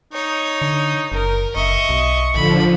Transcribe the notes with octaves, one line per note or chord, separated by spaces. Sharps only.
D#4 C#5
D3
F#1 A#4
F#1 D#5 E5 C#6
B1
A1 D3 F3 B5